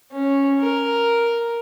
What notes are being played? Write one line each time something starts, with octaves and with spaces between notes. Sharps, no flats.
C#4
A#4